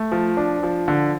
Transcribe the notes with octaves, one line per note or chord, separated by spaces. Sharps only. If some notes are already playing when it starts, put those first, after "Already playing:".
Already playing: A3
F3
D4
F3
D3